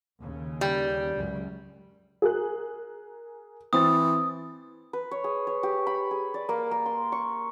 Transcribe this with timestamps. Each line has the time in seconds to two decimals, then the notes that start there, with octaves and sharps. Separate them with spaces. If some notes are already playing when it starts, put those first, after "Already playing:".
0.21 D#2 C#3
0.61 G3
1.16 C#2 F#2 C#3
2.22 G#4 A#4 F#6
3.73 E3 C4 D#6 A6
4.93 B4
5.11 C#5
5.24 G#4
5.47 C#5
5.63 G4
5.87 B5
6.11 G#4
6.34 D5
6.49 A#3
6.71 A#3
6.86 C6
7.12 C#6